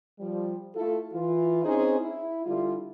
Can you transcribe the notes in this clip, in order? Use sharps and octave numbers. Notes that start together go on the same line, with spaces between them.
F3 G3
A3 E4 F4 A4
E3 F4
C4 C#4 D#4 G#4 C5
E4
D3 G3 E4 F4